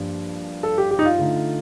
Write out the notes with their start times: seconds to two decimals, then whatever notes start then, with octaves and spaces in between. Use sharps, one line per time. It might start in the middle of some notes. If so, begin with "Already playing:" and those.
Already playing: G2 F3 A#3 D4
0.63 A4
0.78 G4
0.91 G4
0.99 D#4
1.05 F4
1.19 D3 A3 D#4